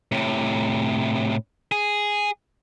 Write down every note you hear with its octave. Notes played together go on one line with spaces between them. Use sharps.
A2 C3
G#4